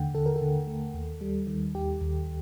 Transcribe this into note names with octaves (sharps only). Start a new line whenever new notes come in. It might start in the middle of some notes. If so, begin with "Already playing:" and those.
Already playing: D#2 D3 A3 F#5 G5
D3 A4
A#4
A4
D3
A3
D#2
G3
D#3
D#2 G4
D#2